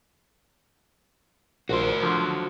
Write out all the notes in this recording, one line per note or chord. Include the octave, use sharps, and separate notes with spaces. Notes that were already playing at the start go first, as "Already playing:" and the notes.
A#1 F#4 C5
D3 F3 F#3